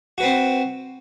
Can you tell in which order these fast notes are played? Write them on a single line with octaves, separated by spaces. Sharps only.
F#4 B4 C4